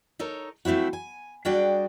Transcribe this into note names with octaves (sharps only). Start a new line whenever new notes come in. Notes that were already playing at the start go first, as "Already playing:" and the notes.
D#4 A4 A#4 C#5
F3 A3 C4 E4 F#4
G#5
G3 D4 F#4 G#4 D5 G5